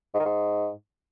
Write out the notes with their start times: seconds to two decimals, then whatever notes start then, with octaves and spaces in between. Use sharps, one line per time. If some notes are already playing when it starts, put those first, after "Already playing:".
0.14 G#2
0.20 D#3
0.25 G#2